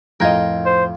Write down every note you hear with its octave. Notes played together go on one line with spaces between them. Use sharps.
F2 A2 F4 A#4 D#5 G5 G#6
C5